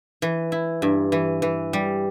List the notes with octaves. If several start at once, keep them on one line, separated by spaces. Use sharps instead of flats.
E3
E4
G2
E3
E3
G3